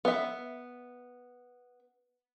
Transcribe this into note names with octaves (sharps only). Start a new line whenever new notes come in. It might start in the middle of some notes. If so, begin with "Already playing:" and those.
B3 E5